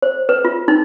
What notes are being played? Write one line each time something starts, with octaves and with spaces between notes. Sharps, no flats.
C5
B4
F4
D#4